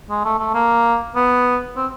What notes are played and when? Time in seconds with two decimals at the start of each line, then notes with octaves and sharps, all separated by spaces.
0.09 G#3
0.24 A3
0.39 A3
0.54 A#3
1.15 B3
1.77 C4